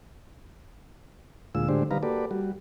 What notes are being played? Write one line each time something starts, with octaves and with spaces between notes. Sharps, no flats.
D2 A#2 G#3 F4 E6
A2 D3 G#3 D4 G4 C5
D3 G3 D#4 B4 F5 A#5
A#3 F#4 G4 A4 B4 D5
G3 F#4